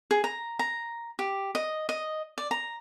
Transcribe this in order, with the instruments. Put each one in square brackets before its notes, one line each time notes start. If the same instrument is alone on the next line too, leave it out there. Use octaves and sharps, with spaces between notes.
[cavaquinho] G#4
A#5
A#5
G4
D#5
D#5
D5
A#5